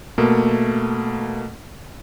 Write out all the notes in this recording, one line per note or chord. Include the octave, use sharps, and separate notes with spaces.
B2 A3 A#3